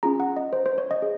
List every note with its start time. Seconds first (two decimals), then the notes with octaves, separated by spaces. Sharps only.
0.03 C#4 F4 G#4 A#5
0.20 F#5
0.37 D#5
0.53 C5
0.66 C5
0.78 C#5
0.91 D#5
1.02 G#4